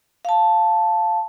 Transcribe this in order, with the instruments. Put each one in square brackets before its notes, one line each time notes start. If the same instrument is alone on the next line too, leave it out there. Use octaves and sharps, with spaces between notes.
[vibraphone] F5 A5